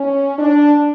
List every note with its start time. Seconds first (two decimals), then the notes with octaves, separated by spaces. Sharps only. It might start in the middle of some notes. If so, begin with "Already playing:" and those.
Already playing: C#4
0.38 D4